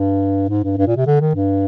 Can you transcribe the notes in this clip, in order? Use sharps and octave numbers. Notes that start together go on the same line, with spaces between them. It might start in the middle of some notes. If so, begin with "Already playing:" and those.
Already playing: G2
G#2
G2
G2
A#2
C3
D3
D#3
G2